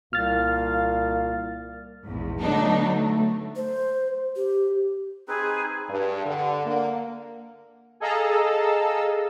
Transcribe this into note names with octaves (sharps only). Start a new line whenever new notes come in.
C2 A#2 F5 F6 A6
A#1 E2 G#2
D3 F#3 A3 B3 D4 D#4
A3
C5
G4
C4 D#4 G#4 B4
G2
D3
A#3
G#4 A4 D#5 F5 A#5 E6